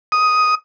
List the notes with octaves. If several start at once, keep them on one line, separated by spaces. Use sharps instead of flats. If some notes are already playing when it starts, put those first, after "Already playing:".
D#6